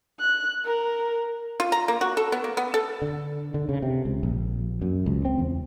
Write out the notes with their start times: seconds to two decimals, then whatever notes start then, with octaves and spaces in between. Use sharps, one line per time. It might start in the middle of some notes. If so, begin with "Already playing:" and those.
0.21 F#6
0.65 A#4
1.60 F4
1.72 A#5
1.88 A#3
2.01 F#4
2.17 A4
2.32 B3
2.44 A#3
2.57 B3
2.74 A4
3.02 D3
3.54 D3
3.69 C#3
3.82 C3
4.05 C#2
4.23 A#1
4.82 F#2
5.06 C#2
5.25 C4
5.39 E2